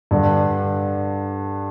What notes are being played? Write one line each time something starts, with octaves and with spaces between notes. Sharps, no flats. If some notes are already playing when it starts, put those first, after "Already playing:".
G2 D3